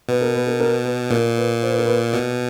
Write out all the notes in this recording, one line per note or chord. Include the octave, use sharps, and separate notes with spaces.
B2 B4
A#4
B4
A#4
A#4
B4
A#2 A#4
B4
C5
B4
A#4
B4
B2